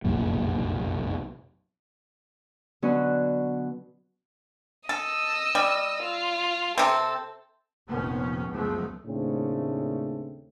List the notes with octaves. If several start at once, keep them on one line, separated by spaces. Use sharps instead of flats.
F1 B1 F#2 A#2
B2 D3 F#3 B3 C#4 F#4
A4 D#5 E6
G3
F4
C3 C4 A4
F1 A#2 D#3 F3 B3 C#4
C#2 F#2 F3 G#3 A3 B3
D#2 A2 C#3 A3 C4 D4